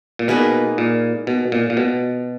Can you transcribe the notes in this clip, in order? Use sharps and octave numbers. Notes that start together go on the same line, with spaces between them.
A#2
B2 A#3 D#4 G#4 B4
A#2
B2
A#2
A#2
B2